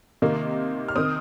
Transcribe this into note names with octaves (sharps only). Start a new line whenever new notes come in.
C3 D#3 A#3
F6
D#3 C4 D#6